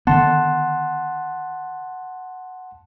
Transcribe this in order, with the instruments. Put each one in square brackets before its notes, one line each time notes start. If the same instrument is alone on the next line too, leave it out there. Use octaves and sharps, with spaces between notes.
[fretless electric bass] D3 D#3 B3 [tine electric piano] F#5 A5 C6